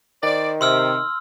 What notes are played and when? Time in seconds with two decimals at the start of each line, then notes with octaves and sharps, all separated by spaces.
0.23 D#3 C5 D5
0.61 C3 C6 E6 F6